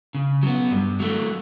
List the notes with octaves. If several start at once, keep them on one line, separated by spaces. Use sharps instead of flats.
C#3
F#3 B3
G2
F#3 A3